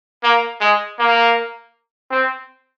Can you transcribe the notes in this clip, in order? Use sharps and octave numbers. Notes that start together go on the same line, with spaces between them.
A#3
G#3
A#3
C4